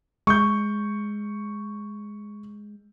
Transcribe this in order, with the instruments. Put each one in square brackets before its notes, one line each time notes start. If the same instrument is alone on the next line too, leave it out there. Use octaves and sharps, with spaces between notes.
[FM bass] G#3 [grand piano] C#6 G6